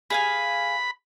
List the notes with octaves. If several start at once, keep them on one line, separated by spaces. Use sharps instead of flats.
G#4 F5 G#5 B5